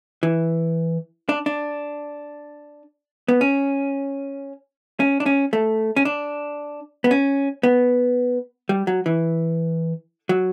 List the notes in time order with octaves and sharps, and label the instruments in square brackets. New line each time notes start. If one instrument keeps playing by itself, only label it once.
[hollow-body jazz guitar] E3
D4
D4
B3
C#4
C#4
D4
C#4
A3
C#4
D4
B3
C#4
B3
G3
F#3
E3
F#3